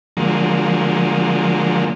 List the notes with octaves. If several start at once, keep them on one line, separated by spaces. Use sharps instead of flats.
D3 F3 F#3 G#3 A#3